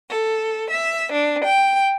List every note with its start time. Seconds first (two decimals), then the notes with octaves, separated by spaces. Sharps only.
0.10 A4
0.71 E5
1.13 D4
1.45 G5